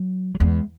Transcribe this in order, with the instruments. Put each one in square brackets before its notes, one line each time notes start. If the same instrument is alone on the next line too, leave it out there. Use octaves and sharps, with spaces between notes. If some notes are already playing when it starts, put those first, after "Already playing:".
Already playing: [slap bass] F#3
F#3
[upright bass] E2 [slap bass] G#3